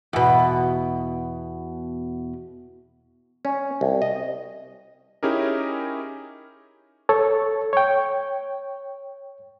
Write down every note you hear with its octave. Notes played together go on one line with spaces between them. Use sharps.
E2 B2
C#4
C2
D#5
C#4 D#4 E4 G4 G#4 A#4
A4 C#5
C#5 G5